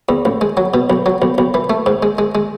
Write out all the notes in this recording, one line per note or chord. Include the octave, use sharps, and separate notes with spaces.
E2
A1
G#3
F#3
B2
B1
F#3
B1
B1
E3
A3
G#2
G#3
G#3
G#3